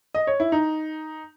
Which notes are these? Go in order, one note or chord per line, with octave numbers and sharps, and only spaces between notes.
D#5
C#5
E4
D#4